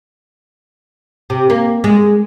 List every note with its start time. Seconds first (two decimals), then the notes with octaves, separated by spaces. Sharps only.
1.30 C3
1.50 A#3
1.84 G#3